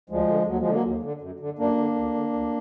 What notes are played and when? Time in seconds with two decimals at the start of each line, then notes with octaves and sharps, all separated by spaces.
0.10 D2 F3 G#3
0.28 D3
0.47 D#2 F#3
0.59 F3 G#3
0.65 D3
0.71 F#3 A#3
0.84 D#2
1.03 D3
1.21 F#2
1.40 D3
1.59 F#2 A#3 D4
1.77 D3
1.96 D2
2.14 D3
2.33 D2